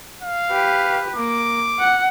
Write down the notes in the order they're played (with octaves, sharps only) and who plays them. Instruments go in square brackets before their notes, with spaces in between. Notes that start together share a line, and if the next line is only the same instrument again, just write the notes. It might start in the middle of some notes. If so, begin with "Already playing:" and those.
[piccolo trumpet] F5
[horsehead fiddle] G4 B4
[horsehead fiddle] A#3 [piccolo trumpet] D6
[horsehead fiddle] F#5